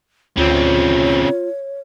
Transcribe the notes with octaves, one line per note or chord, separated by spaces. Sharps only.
D2 C#3 C4 F4 C#5